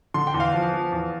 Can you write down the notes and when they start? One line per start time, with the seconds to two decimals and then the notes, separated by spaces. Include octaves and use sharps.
0.14 D3 C6
0.27 G5
0.34 E2
0.40 F5
0.54 F3
0.73 F3
0.92 E2